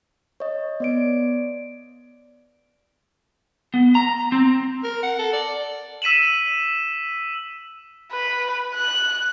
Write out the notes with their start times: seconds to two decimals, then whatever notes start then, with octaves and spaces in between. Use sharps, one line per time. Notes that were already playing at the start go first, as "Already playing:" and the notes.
0.40 C#5 D#5
0.80 B3 D5 D7
3.74 B3
3.95 A#5
4.32 C4
4.84 A#4
5.03 F#5
5.19 A4
5.33 D5
6.02 E6 B6 D#7 E7 F#7
8.12 B4
8.75 F#6